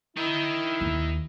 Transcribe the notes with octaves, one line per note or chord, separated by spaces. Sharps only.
D#4 E4 G5
D#2